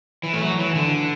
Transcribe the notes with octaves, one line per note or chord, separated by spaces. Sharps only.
E3
A3
F#3
E3
D3